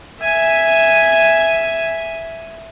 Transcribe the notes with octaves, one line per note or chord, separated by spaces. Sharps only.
E5 G#5